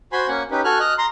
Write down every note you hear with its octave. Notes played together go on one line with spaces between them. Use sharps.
F#4 C5 G#5 B5 C6
A#3 C#4 F#5 G#5
C#4 D#4 G4 B4
F#4 A4 G#5 F6 F#6
D#5 F6 F#6
A#5 C6